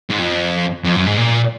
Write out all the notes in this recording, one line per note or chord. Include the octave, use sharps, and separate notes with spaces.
G#2
F2
F2
F#2
G#2
A#2